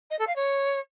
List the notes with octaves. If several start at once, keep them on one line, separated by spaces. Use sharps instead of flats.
D#5
A4
F5
C#5